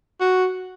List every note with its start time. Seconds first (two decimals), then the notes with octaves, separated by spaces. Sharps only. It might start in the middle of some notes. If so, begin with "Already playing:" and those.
0.21 F#4